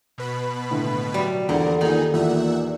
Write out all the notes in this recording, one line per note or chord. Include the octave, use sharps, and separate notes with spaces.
B2 B4 B5
A2 D3
F#3 G3
A#1 E2 D3 A#4
A#2 D#3 D#4 G#4
E2 A#2 E5 F#5